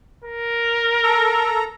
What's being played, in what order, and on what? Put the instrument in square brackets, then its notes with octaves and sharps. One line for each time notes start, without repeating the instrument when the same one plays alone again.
[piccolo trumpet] A#4
[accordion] A4 A#5